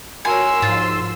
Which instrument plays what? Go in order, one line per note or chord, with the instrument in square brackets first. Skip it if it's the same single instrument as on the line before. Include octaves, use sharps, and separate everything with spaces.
[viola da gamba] F#4 A#4 C#5 [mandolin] G#5 [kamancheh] C6 E6
[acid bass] G#2 [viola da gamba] F3 [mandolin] F4